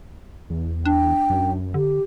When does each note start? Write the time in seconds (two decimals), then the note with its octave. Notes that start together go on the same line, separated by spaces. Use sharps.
0.50 E2
0.85 D4 G5
1.30 F#2
1.74 D3 G4